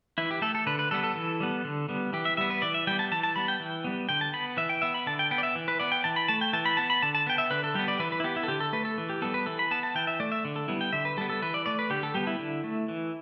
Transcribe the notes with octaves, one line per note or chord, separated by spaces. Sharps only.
E3 E4
G4
A3 A4
A4
D3 B4
B4
G3 B3 A4
A4
E3
G3 B3
D3
G3 B3
E3 G4
E5
G3 B3 E5
B4
E3 D5
E5
G3 B3 G5
A5
E3 A5
A5
G3 B3 B5
G5
E3
G3 B3
D3 G5
A5
B3 B5
E3 E5
G5
B3 E5
B5
D3 A5
G5
B3 G5
D5
E5
E3
B4
B3 D5
G5
E3 A5
B5
A3 A5
G5
E3 A5
B5
B3 A5
B5
D3 A5
A5
B3 G5
E5
D3 B4
A4
G3 B3 G4
D5
E3 B4
B4
E4
B3 G4
E4
A4
D3 G4
A4
A3 B4
A4
E3
G4
G3 B3 A4
B4
E3 A4
B5
B3 A5
A5
E3 G5
E5
A3 D5
E5
D3
A4
G3 B3 E4
G5
D3 E5
B4
G3 B3 A4
A4
E3 B4
D5
A3 D5
B4
D3 G4
A4
G3 B3 G4
E4
D3
A3
E3